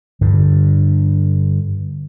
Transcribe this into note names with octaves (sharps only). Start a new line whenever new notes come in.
G2 D3